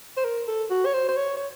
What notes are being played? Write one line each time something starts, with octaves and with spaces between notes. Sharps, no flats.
C5
A#4
A4
F#4
C#5
C5
C5
C#5
C#5